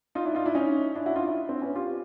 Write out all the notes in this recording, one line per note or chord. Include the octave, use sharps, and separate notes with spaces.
D#4 F4
D4 E4
D#4 F4
D4 E4
C#4 D#4
D4 E4
E4 F#4
D#4 F4
D4 E4
C4 D4
B3 C#4
F4 G4